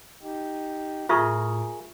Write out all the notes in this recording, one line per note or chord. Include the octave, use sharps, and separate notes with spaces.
D#4 G4
A2 F4 G#4 A#4 E5 C#6